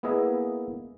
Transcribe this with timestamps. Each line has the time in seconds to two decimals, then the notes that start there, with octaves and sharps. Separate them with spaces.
0.03 A#3 B3 E4 G#4 D#5 E5